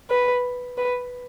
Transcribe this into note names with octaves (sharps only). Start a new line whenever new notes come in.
B4
B4